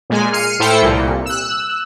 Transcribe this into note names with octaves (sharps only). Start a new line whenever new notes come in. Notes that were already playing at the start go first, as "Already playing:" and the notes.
A#2 G#3 G#5
F6 C7 C#7 D#7
A2 E4 A4 C5 G5 C#7
C2 A#2
E6 F#6